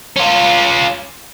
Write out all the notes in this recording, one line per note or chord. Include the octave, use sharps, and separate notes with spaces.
C#4 F4